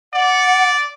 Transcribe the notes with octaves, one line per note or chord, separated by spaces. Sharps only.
D5 F#5